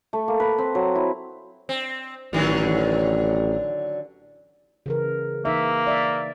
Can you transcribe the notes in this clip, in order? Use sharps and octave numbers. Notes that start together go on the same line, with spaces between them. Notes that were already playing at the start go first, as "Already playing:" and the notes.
A3
A#3
B4
C4
F#3
E4
C4
A1 D3 D#3 F#3
C#3 E3 A#4
E3 A#3 D#4 E5
D5 E5